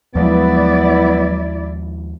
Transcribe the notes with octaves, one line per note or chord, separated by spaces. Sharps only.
D#2 F3 F#3 G#3 B3 E4 D5